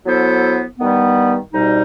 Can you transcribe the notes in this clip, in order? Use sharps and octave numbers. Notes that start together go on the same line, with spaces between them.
F#3 B3 E4 A4 C5
G2 D#3 G3 B3
C2 B2 G3 D#4